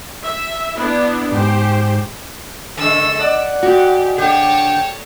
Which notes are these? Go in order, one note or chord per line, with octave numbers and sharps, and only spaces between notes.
E5
B3 D4 E4
G#2 G4 C5
C#3 G#3 A4 E6
D5 F#5
G#2 F#4 G4
D3 G4 C#5 G5 A5